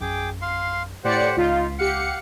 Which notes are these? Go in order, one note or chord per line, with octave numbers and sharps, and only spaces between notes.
A#1 F#2 G#4 G5 D6
F5 C6
A2 G4 C5 D5 F#5 C#7
C#2 D#4 F4 B6 C7
G4 F5 F#5 C#7